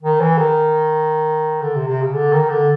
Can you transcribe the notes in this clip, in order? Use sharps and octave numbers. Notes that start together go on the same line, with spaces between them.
D#3
E3
D#3
D3
C3
C3
C#3
D3
D#3
D3